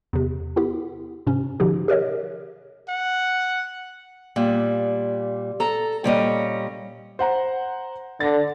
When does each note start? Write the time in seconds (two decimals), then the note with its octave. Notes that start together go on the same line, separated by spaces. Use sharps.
0.13 E2 C3
0.56 B3 E4 G4
1.27 G#2 C3 C#4
1.60 B2 D3 F3 D#4 G4
1.88 G4 A#4 C#5 D#5
2.89 F#5
4.36 A#2 G3
5.60 A4 A#5
6.04 A#2 G3 C#4 D#5
7.19 C5 F#5 A#5
8.20 D3 A6 A#6